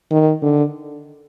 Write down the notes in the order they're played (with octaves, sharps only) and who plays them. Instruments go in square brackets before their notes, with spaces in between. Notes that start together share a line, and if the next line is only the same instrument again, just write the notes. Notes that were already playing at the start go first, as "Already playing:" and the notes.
[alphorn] D#3
D3